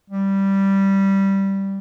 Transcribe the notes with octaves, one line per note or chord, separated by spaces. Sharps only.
G3